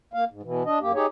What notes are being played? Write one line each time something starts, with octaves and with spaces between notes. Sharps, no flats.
A#3 F5
G#2
B2 E3
D4 D#5
F#2 A#3 G4
D#4 G4 G#4 C#5